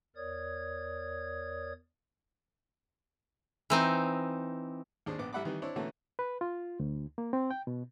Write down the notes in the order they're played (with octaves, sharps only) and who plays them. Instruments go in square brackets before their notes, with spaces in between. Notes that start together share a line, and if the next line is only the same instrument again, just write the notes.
[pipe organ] E2 A#4 C#5 D5 D#6 G#6
[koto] E3 C4 D#4
[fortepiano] D#2 D4 G#4 C5
A#1 B3 D6
A1 G3 E5 F#5 B5 D6
D#3 E3 G3
C4 D4 E4 C#5
B2 D3 E3 A3 A#3 C#4
[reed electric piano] B4
F4
D2
A#3
C4
G5
B2